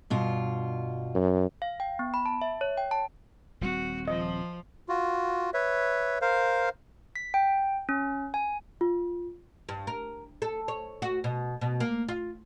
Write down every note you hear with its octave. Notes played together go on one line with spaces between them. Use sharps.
G2 B2 F4
F#2
F5
G5
B3
B5
A5
E5
C#5
G5
A5
D#1 G3 C4 F#4
F3 D#5
F4 F#4
B4 C#5 E5
A#4 C5 F5
B6
G5
C#4
G#5
F4
G2
A#4
A4
C#5
F#4
B2
B2
A#3
F4